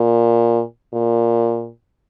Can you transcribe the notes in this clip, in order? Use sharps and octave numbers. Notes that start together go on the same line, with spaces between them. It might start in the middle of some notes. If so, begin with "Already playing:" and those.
Already playing: A#2
A#2